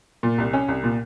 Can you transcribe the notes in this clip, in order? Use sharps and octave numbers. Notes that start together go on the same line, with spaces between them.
A#2
C2
C#4
C2
A#2